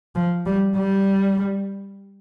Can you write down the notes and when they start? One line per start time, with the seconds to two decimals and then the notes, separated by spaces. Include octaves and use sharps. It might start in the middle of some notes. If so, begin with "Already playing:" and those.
0.15 F3
0.46 G3
0.76 G3